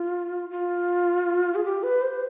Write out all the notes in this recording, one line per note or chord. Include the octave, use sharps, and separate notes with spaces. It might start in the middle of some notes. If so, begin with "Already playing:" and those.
Already playing: F4
F4
G#4
G4
B4
C5